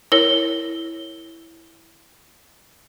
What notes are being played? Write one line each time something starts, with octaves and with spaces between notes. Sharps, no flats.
E4 A#4 C#5 G7